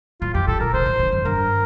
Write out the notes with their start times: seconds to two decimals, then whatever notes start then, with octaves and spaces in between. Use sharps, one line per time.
0.21 A2 F4
0.34 F2 G4
0.47 A2 A4
0.60 A#2 A#4
0.73 C3 C5
0.86 A2
0.99 G2
1.12 F2
1.25 G2 A#4